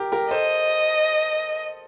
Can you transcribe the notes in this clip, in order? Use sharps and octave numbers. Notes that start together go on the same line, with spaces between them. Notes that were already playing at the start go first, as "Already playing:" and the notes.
Already playing: G4 A#4
G4 A#4
A4 C5 D#5